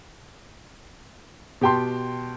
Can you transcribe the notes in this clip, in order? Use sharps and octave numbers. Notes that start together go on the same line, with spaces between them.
B2 G4 G5 A5 C6